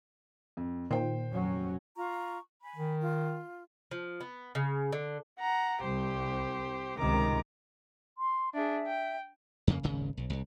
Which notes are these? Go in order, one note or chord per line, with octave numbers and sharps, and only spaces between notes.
F2
A#2 D#3 C5 G5
F1 F#3 C#4
F4 A#5 C#6
G#5 B5
D#3
F4
F3
B3
C#3
D3
F#5 A#5
C2 G4 C5
C#2 C3 D#3 A#5 D6
C6
D4 G#4 E5
G5
F2 C#3 A#3
D#1 G#1 C#3
B1
C2